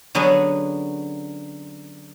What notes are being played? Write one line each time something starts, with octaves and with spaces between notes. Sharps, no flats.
D3 F#3 B3 C#4 G#4